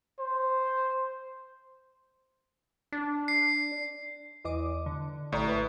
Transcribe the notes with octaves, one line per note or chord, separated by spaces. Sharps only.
C5
D4
C7
E2 D#5 D6
D3
A1 A2 D5 A#5
A1 B4 E5